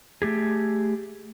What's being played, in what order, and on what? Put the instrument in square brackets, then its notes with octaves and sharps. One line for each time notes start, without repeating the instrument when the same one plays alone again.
[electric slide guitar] A3 G4 G#4